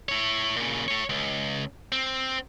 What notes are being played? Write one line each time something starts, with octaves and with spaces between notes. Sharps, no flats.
E4 C#5
A#2 C#3
A3 C#5
C#2
C4